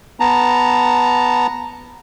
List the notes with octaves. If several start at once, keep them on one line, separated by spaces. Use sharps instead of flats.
B3 A5 A#5